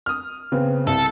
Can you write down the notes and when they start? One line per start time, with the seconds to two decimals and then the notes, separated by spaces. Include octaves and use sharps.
0.06 D#6 F6
0.52 C#3 B3 C4
0.87 C2 A4